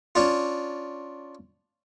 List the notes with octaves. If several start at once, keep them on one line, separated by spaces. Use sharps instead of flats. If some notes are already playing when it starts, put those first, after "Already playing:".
C#4 D4 F4